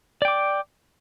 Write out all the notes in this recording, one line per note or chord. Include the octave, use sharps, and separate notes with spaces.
D5 G5 D6